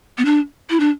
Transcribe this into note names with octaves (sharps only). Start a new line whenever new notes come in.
B3
D4
E4
D4